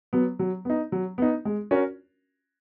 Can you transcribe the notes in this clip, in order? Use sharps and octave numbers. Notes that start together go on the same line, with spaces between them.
F#3 B3
F#3
B3 D#4
F#3
B3 D#4
G#3
C#4 F#4 A#4